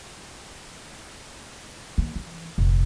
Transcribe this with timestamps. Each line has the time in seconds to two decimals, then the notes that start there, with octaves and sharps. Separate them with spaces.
1.98 D#3 A#3
2.16 E3
2.58 F1 A#1